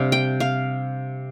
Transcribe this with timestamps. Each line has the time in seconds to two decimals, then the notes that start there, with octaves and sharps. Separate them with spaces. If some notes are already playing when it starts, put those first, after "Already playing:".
Already playing: C3 G3 D4 F5
0.12 G5
0.40 F5